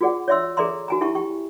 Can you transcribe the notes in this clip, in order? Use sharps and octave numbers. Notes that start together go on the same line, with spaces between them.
F4 F#4 G#4 D5 F#5
C#5 D5 E5 C6 E6
G#4 A4 D5 E5 A#5 C6
F#4 G#5 A#5
E4 G4 E5 A5 C#6
G4 G5 C#6